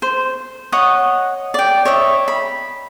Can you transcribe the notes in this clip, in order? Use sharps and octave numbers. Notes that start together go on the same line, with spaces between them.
C5
C#5 D#5 F#5 D#6
D5 G5
C#5 D#5 E5
B5